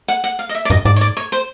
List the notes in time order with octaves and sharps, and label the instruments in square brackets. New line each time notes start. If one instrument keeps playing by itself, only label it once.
[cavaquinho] F#5
F#5
F5
D#5
E5
D5
[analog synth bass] G2 [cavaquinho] D#5
[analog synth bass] G#2 [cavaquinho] D5
[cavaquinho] C#5
D5
C#5
C5